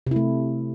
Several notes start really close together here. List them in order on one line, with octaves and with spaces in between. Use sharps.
C3 E4 A3